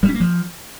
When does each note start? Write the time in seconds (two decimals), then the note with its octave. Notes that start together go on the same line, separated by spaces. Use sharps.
0.03 G3
0.09 C#4
0.14 A#3
0.20 F3